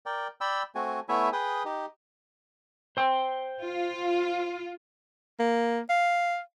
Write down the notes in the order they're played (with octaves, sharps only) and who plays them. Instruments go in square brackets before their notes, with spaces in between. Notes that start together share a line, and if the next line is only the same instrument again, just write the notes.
[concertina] A#4 D5 G5
D5 G5 B5 E6
A3 C4 F#4 G#5
A3 B3 E4 C#5 E5 G#5
G#4 B4 G5 D#6
D#4 G4
[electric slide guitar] C5 G5
[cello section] F4
[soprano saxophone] A#3
F5